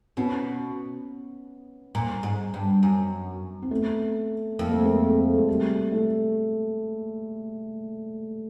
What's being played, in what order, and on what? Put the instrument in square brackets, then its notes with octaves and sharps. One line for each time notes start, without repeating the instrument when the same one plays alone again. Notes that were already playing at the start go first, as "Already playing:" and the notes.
[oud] B2 [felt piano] B3 C#4
[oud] A#2
G#2
G2
F#2
[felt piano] C4
A3 B3
[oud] F2 [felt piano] A#3
[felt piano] A3
G#3 A#3
G#3
G3 A3
A3